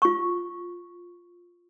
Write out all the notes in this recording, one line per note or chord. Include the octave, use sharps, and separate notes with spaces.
F4 C#6